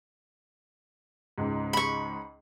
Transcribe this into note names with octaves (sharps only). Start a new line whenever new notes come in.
C#2 G#2
B5 C#6